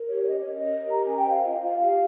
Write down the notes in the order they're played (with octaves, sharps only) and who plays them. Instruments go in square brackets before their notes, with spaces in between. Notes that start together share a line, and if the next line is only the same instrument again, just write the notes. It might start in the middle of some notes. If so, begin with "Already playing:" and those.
Already playing: [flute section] A#4
G4 C#5
C#5
C#4 D#5
C#5
C#4
D#5
A#4
G4 A#5
C#4 G#5
G5
C5
F5
F4 D#5
F4 F5
G4 F5